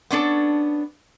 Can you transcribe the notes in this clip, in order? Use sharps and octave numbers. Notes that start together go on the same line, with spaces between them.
B3 C#4 D4 A4